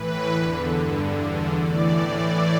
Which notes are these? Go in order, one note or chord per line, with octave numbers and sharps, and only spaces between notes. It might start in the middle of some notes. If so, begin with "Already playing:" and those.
Already playing: A2 E3 B4
E2 D3
G2 D3
E2 D3
A2 E3 D5
A2 E3 D5